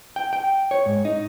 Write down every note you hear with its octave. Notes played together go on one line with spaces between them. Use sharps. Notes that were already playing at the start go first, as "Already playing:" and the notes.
G5
G5
C#5
G#2
D#4